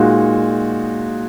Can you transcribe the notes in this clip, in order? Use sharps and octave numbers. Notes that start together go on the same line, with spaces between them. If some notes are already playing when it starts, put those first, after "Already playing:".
Already playing: A#2 G#3 D#4 F#4